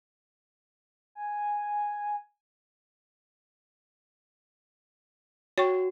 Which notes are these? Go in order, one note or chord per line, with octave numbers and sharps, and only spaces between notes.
G#5
F#4 C#5 G5 C#6